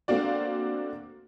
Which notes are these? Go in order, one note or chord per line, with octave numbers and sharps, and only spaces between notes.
A3 A#3 C4 D4 F#4 D5